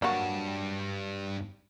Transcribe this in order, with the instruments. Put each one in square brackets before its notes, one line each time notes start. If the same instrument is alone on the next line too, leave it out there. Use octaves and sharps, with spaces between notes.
[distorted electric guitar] G2 A5 [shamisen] F#3 A#3 F#4